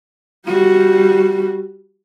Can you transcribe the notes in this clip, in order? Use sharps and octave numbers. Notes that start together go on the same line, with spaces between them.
G3 F#4